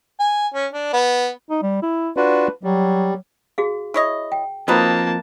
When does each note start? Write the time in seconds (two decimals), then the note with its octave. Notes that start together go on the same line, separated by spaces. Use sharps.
0.20 G#5
0.54 C#4
0.73 D4
0.93 B3
1.50 D#4
1.62 G3
1.82 E4
2.17 D4 F4 F#4 B4
2.63 F#3 G3
3.58 F#4 G#4 F5
3.94 E4 C#5 D#5
4.32 G5
4.68 D#3 F3 A#3 C4 D#4 F#4 B4 A5